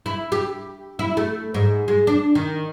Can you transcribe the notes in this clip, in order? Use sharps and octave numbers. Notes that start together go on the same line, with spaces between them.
E4
G4
E4
A3
G#2
G#3
D4
D#3